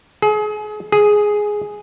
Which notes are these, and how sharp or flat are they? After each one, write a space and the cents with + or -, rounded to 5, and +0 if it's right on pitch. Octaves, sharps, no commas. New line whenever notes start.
G#4 +35
G#4 +5